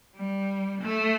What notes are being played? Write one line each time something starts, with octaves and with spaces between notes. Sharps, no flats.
G3
A3